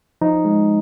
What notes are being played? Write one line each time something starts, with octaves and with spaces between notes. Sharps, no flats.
F3 D#4
G#3